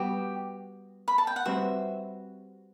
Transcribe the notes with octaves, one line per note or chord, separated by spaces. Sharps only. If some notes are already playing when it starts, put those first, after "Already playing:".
Already playing: G3 B3 F#4 G4
B5
A5
G5
F#5
G3 C4 F#4 B4 E5